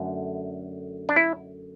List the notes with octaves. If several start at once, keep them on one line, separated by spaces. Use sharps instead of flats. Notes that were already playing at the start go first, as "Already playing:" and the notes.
Already playing: F#2 D3 A3
D4
E4